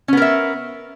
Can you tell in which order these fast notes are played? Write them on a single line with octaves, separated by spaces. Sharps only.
C#4 B3 A#4 E5